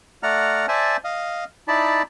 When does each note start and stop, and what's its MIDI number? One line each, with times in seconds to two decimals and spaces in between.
0.23 0.66 57
0.23 0.66 74
0.23 0.66 78
0.23 0.66 82
0.23 0.66 89
0.68 0.97 72
0.68 0.97 74
0.68 0.97 76
0.68 0.97 80
0.68 0.97 81
1.04 1.44 75
1.04 1.44 77
1.68 2.02 63
1.68 2.02 64
1.68 2.02 74
1.68 2.02 81
1.68 2.02 83